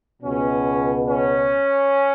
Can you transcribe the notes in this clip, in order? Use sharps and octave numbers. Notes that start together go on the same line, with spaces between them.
C#2 B2 C#4
C#4